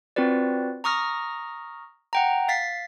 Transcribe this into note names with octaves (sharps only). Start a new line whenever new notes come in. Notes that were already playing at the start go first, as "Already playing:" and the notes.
C4 F4 F#4 B4 D5
A#5 C#6 D#6 F6 A#6
F#5 G5 A#5
F5 A6 B6 C7